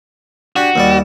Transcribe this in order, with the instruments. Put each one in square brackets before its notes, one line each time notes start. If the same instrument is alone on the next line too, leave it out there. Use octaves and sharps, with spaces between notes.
[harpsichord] D4 G4 [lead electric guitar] F#4
[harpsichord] D#2 G3 D5